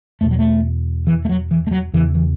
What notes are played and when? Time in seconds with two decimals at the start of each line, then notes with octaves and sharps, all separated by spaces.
0.21 E2 B2 A3
0.31 F#3
0.39 A3
1.07 E3
1.25 A3
1.29 F#3
1.51 E3
1.67 A3
1.71 F#3
1.93 E2 C#3 E3
2.15 E3